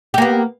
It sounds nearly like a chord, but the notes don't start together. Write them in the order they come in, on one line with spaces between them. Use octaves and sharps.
G4 A#3 B3